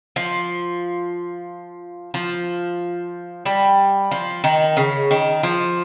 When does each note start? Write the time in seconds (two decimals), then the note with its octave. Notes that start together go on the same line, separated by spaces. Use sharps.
0.16 F3
2.14 F3
3.46 G3
4.11 F3
4.44 D#3
4.77 C#3
5.11 D#3
5.43 F3